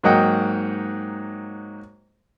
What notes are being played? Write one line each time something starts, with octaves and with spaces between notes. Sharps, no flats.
G#2 F#3 A#3 D#4 F#5 G5